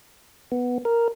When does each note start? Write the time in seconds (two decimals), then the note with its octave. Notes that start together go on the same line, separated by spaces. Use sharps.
0.52 B3
0.85 A#4